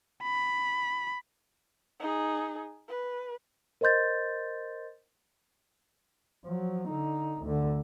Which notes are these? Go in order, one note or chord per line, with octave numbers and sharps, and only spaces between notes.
B5
D#4 G#4
B4
A#4 C5 D#5 C6 G6 A6
F3 F#3
D3 D#4
D2 D3